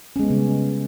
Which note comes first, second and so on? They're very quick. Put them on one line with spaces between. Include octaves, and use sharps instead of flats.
C#4 G#3 B3 G3 C#3